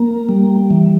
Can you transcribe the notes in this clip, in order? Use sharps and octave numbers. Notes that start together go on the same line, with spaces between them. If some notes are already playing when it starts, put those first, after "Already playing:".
Already playing: A#3
G3
E3